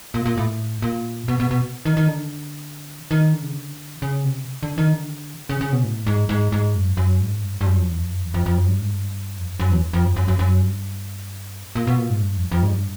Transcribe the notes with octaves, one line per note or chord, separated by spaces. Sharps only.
A#2
A#2
A2
A#2
B2
B2
B2
D#3
D#3
D3
D#3
D3
C#3
D3
C#3
C3
D3
D#3
D3
C#3
C#3
B2
A2
G#2
G#2
G#2
F#2
F#2
G#2
G2
G2
F#2
F2
E2
F2
F#2
E2
F2
F2
F#2
G2
G#2
G2
F2
F#2
F#2
E2
F2
F#2
F#2
F#2
F#2
G2
A#2
B2
A#2
G#2
G2
F2
F2
G#2
G2